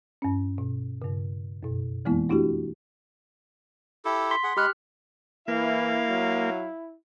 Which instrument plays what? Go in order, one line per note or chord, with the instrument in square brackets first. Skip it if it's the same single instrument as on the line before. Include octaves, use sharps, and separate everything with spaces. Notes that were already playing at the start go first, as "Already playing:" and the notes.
[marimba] G2 C#4
B2
G2 C#3
F#2 B2
F2 E3 G#3 A#3 B3 E4
A3 D4 E4 F#4 G4
[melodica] E4 G4 A4
[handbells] C6 B6
[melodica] G#4 F#5
[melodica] G#3 B5 [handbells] G4 F6 F#6
[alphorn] E3 [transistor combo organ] A#3 [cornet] E4 [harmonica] F5
[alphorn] F#3